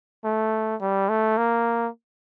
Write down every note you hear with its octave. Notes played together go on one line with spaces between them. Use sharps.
A3
G3
A3
A#3